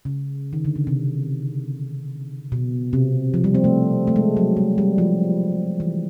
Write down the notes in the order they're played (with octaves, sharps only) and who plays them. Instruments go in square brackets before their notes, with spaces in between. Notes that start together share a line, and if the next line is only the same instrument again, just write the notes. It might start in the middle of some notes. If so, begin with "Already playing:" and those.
[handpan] C#3
D#3
D3
C#3
C3
B2
C3
F3
G3
C4
A3
A3
G#3
F#3
G3
G3
F3
E3